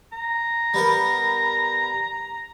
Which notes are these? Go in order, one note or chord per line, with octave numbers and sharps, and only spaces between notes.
A#5
G3 B3 A#4